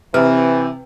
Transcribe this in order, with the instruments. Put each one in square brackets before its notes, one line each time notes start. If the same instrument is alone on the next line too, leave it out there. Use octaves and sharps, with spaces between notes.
[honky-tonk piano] C3 [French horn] E3 [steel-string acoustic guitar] C4 [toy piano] B4